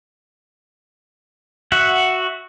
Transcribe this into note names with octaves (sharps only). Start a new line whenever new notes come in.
F#4 E5 F#5